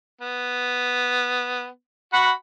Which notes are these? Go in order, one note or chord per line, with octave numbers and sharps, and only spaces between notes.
B3
F#4 F#5 B5